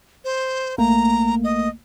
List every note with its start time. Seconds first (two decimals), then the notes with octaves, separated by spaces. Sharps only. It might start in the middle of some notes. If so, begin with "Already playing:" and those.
0.25 C5
0.78 A#1 A3 A#3 A#5
1.44 D#5